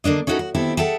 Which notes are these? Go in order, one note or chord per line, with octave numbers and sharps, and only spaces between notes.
D3 A#3 D4 D#5
C#4 D#4 E4 F#4 A4 A#4
F#4
B2 D#3 C4 E4 G4 A4
G#4 A4 E5 F#5 G5 A5